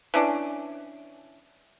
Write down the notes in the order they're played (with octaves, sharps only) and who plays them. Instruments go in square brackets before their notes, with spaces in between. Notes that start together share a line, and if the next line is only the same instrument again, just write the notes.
[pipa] E3 C#4 D4